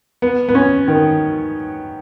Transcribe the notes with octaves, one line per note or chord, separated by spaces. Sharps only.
B3
B3
C#4
D#3